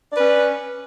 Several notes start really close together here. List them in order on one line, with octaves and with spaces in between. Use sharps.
D5 B4 C#4